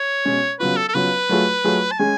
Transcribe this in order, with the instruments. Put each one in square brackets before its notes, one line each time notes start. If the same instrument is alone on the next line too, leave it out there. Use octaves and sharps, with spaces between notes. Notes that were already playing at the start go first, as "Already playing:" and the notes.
Already playing: [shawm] C#5
[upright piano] B2 G#3 C#4
[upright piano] C#3 F#3 B3 F4 [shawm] B4
[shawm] A4
A4
[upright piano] C#3 F#3 B3 F4 [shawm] B4
[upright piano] F#3 A3 F4 G#4
F#3 A3 F4 G#4
[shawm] A5
[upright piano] G#3 C#4 G#4 [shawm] G#5